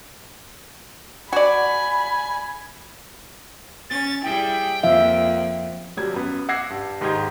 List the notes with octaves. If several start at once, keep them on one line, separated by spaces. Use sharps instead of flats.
F#4 D5 G#5 B5
C#4 A6
G3 E4 G#4 G5
F2 F3 A#3 E5 F5
D#1 F#3 G3 G#6
F#2 B3
F#5 D6 E6 G#6 A#6 C7
G2
D#2 G#2 D#4 G4 G#6